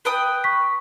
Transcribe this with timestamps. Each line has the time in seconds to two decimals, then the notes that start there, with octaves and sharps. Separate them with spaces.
0.05 B4 G5 D#6
0.44 C#6 B6